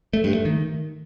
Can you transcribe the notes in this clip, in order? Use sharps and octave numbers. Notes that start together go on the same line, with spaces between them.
A3
G2
A3
D#3